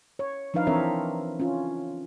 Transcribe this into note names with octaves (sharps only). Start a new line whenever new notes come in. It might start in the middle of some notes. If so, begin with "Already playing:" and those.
C#5
F3 D4 D#4 B4 F5
E3 C4 D4 A#4 C#5 E5
C#4 F4